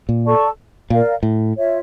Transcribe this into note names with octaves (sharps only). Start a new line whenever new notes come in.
A#2
A4 D5 A5 C#6
A#2 A#4 D5 F5
A2
F4 C#5 E5